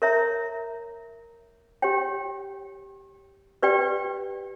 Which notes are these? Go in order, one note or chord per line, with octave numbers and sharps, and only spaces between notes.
A#4 C#5 E5 A#5
G4 C#5 G5
G4 B4 D5 G5